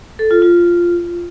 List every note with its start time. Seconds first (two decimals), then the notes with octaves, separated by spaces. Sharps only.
0.19 A4
0.31 F4
0.42 F4